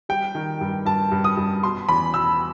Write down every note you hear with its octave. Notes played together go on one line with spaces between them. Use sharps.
G3 G5
D#3
G2
G2 A5
G2
D#6
G2
B2 C6
E2 B5
B2 E6